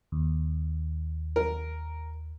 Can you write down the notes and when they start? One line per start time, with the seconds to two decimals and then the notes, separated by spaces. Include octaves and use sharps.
0.12 D#2
1.36 A#4